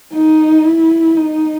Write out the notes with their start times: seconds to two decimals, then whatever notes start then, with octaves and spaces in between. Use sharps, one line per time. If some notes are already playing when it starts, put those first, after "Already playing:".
0.13 D#4
0.64 E4
1.17 D#4